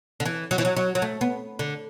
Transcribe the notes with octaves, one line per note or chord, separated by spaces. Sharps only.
D3
E3
F#3
E3
F#3
F#3
F#3
A3
B3
D3